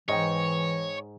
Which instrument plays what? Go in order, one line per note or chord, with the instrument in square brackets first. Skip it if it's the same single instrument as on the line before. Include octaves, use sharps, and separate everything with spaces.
[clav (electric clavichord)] G#2 [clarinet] E3 [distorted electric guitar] C#5 [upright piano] D#5 G5